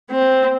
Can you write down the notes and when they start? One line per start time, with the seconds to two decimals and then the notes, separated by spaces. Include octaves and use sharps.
0.11 C4